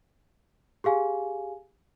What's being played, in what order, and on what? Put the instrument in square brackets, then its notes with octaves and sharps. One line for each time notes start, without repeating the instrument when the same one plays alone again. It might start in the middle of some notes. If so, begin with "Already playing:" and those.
[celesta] G4 G#4 F5 G#5